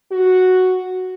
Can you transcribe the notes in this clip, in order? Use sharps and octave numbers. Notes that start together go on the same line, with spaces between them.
F#4